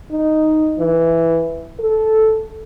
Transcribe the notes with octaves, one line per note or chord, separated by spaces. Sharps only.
D#4
E3
A4